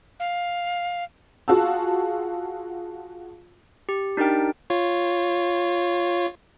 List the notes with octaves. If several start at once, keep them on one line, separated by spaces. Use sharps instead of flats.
F5
F4 F#4 G#4 F5 A5 E6
G4
D4 D#4 G4 A#4 G5
F4 C#5